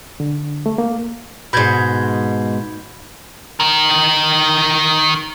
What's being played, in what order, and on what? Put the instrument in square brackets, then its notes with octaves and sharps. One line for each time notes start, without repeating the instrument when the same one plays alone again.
[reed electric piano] D3
A3
A#3
[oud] G#2 B2 [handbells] B5 G6 G#6
[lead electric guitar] D#3 A#4